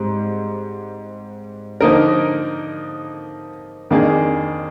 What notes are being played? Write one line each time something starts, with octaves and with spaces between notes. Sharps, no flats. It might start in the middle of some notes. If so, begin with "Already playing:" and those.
Already playing: G#2 G3 C4
D3 F3 A#3 D#4 A#4
F2 D#3 A#3 D4 G#4